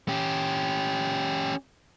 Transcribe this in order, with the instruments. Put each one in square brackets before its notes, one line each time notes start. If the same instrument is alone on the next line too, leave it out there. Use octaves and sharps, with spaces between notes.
[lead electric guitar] C#4 G4